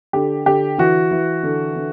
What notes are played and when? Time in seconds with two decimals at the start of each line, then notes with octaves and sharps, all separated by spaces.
0.13 D3 G4
0.46 D3 G4
0.78 E3 F#4
1.11 E3
1.43 D3
1.76 D3